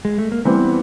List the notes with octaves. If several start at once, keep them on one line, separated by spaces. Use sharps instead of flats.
G#3
A3
A#3
E3 G3 B3 C4